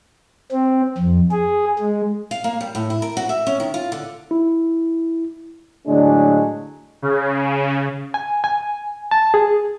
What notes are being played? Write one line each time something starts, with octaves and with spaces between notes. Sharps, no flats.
C4
F2
G#4
G#3
F5
A#3
G3
A2
E4
A#4
F#4
E5
C#4
D#3
F4
D3
E4
A2 D3 F#3 G#3 D4
C#3
G#5
G#5
A5
G#4